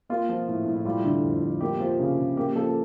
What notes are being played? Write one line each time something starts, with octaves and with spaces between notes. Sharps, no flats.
A#3 F4
F3
A2
A2
E4
G3 F4
D3
F2
F2
A#3 G4
F3
C#3
C#3
A#3 G4
F3 A4